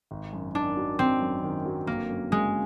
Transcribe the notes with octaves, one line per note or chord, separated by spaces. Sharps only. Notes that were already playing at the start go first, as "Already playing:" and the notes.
G#1
F#2
D#3 D4
F#3
G#1 C4
F#2
D#3
F#3
G1 A#3
F#2
C#3 G#3